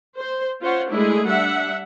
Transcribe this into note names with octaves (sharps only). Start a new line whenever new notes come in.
C5
C#4 F4 C5 C#5 F#5
G#3 A3 D4 E4 G#4
G3 D4 E5 F#5